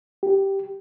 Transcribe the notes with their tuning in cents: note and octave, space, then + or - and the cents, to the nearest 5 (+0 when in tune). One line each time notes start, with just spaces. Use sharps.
G4 -5